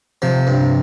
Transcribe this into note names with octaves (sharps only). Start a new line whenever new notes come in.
C3 F3
G2